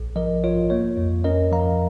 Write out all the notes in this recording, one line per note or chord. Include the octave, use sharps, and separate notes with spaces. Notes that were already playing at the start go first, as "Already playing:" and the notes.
Already playing: A#1
F3 A#4 D#5
F4 C#5
A#3 C#5
F2
C#4 A#4 D#5
F3 F5 A#5